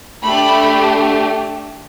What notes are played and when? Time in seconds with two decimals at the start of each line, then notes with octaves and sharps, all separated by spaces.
0.23 A3 D4 G4 B5